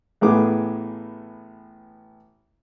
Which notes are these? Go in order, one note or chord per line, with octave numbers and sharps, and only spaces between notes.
A1 A2 B3 G#4 D6